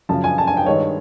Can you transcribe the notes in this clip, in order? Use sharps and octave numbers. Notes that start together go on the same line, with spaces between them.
F#2 C#3 F3 A5
G#5
A5
G#5
G5
G2 D#3 G#3 C#5